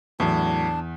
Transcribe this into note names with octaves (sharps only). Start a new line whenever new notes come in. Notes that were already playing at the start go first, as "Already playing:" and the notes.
E2 A2 F#3 D4